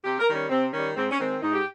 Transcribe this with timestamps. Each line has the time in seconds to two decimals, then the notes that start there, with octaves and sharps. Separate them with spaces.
0.04 C3 G4
0.19 A#4
0.27 D#3 G3
0.35 C#4
0.49 C3 C4
0.73 D#3 G3 C#4
0.95 G#2 C4
1.11 C#4
1.19 D#3 G#3 C4
1.41 G#2 D#4
1.54 G4